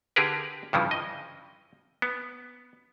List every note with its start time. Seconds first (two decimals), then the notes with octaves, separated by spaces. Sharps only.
0.16 D3 G4 G#4 A#4 B4
0.73 G2 C#3 E3 F3
0.91 D#5
2.02 B3